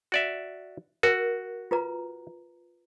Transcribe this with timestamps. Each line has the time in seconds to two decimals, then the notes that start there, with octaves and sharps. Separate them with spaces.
0.12 F#4 D5 E5
1.03 F#4 A#4
1.71 F4 B4 A#5